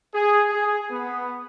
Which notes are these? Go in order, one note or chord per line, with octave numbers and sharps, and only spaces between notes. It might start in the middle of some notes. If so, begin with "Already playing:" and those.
G#4
G#4
B3